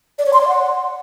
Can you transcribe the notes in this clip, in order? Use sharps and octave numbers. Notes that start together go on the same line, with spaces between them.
D5
C#5
C6
D5
F#5